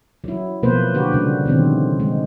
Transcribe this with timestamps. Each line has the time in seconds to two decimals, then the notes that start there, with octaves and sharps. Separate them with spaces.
0.24 F#3 E4
0.63 B2 F3 A#3 B4 C5
0.94 D3 F#4 G4 B4
1.12 C#3 G3
1.45 B2 D3 D#3 F3 C4
2.00 G#3